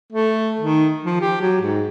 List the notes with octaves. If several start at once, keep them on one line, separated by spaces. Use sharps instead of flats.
A3
D#3
F3
G4
F#3
G#2